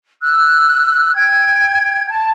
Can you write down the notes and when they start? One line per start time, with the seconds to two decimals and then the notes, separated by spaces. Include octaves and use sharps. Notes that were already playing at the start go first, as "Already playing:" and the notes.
0.22 E6 F#6
1.15 G5 G#6
2.08 A5